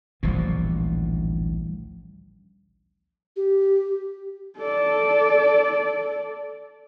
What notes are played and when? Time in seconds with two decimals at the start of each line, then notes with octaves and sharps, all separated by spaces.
0.23 A1 D2 A#2 F3 G3
3.36 G4
4.58 A4 D5